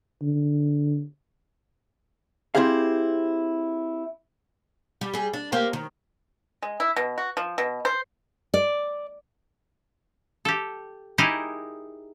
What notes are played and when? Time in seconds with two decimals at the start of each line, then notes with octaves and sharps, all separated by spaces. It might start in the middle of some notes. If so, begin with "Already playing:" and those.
0.22 D3
2.55 C4 E4 G4 G#4 F5
5.01 G3
5.14 G3 G#4
5.33 D4
5.52 A#3 G4 C5
5.73 D#3
6.62 G#3
6.80 E4
6.96 B2
7.18 F#4
7.37 F3
7.58 B2
7.85 C5
8.54 D5
10.45 G4 A4
11.18 D#4 E4 G4 G#4 A#4 D#5